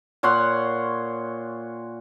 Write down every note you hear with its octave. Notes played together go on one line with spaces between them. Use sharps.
A#2 C#5 F#5 C6